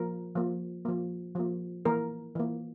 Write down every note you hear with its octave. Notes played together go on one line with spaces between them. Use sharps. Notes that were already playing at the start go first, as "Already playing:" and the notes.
Already playing: F3 A#3 A#4
F3 A#3
F3 A#3
F3 A#3
E3 A#3 A#4
E3 A#3